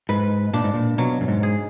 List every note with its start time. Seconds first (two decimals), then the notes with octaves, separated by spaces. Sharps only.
0.09 G#2 B4
0.53 A#2 D4
0.64 G#2
0.74 A#2
0.98 B2 F#3
1.21 F#2
1.28 G#2
1.43 G#4